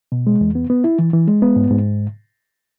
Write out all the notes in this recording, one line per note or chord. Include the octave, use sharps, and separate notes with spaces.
B2
G#3
E2
B3
B3
E4
E3
E3
G#3
B3
G#2
G#2